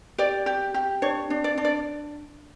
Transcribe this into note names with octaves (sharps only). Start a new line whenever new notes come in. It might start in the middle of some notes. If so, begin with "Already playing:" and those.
G4 D5
G4
G4
D4 C#5
D4
D5
D4
D5